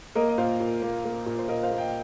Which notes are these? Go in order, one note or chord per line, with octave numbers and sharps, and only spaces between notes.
A#3 A#4 D#5
D#5
A#2 C5 F5
A#2
A#3
A#3
A#2
C5
A#2 A#4 D#5
C5 F5
A#3
D#5 G5